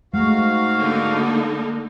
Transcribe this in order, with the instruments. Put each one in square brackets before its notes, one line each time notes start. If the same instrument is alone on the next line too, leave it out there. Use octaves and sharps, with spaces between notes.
[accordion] G#2 F#4 F5 [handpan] G#3 A3
[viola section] D3 A#3 D#4